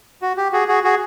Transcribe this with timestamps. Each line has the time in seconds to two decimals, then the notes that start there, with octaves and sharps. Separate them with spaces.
0.22 F#4
0.37 G4
0.53 F#4 G#4
0.68 F#4 G#4
0.84 F#4 G#4